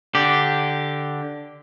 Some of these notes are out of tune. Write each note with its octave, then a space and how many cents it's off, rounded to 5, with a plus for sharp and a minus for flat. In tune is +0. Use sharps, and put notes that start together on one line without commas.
D3 +0 G4 -5